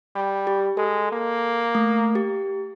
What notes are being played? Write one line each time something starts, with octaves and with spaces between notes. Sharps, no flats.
G3
G4
G#3 A4
A#3
A3
G4